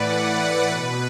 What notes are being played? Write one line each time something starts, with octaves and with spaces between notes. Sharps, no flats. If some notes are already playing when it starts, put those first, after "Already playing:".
Already playing: A2 E3 B4 D5 F#5
B4
B2